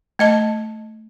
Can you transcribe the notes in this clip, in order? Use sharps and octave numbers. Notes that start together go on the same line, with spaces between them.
A3 D#5 A5